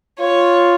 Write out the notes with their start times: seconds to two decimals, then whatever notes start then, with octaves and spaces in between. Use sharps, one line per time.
0.20 F4 C#5